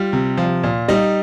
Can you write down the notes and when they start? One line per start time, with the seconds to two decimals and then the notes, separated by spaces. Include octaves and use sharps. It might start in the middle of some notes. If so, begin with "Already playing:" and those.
Already playing: G3 F4
0.13 C3
0.37 F3
0.64 A#2
0.88 G3 D#4 D#5